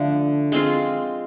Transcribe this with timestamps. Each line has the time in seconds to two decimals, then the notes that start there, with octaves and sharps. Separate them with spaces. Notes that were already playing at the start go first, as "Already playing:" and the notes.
Already playing: D3 F3 A3 D4
0.52 G#3 C4 F4